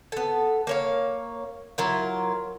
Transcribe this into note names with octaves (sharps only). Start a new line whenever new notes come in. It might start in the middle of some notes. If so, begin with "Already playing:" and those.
B3 A4
A#3 C#5 F5
F#3 E4 F4 A#4